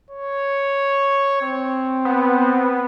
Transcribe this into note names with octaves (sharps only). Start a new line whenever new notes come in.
C#5
C4
B3